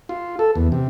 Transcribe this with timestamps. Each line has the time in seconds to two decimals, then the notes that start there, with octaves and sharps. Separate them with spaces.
0.09 F4
0.39 A4
0.55 E2
0.72 C3